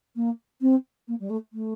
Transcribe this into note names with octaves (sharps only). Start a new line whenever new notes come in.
A#3
C4
A#3
G3
A3
A3